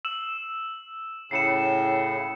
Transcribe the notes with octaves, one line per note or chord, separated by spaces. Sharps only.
E6 E7 F#7
A2 C#3 C7 C#7 E7